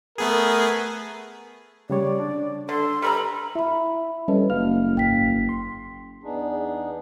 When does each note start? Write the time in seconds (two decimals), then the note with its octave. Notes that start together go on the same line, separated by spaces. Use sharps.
0.18 A3 B3 G#4 A#4
1.90 C#3 G3 C#5 D5
2.20 D4
2.69 D3 A4 C6
3.02 G3 A#4 A#5 B5
3.55 E4 E5 B5
4.28 G3 C#4 A4 B4 D#5
4.50 F#1 F5 F6
4.97 G#1 G5 B6
5.49 C6
6.24 E2 B3 D4 D#4 G#4